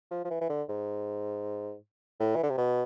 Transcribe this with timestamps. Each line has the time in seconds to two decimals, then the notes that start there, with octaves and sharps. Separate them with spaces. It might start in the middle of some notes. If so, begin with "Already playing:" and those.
0.11 F3
0.25 F3
0.30 E3
0.41 E3
0.49 D3
0.69 G#2
2.20 A2
2.36 E3
2.43 D3
2.50 C3
2.58 B2